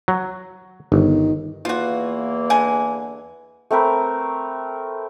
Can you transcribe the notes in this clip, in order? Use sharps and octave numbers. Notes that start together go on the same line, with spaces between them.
F#3
G1 D#3
E2 E3 A#3 F4 F#4
D3 G#3 G#5
A3 C4 A#4 B4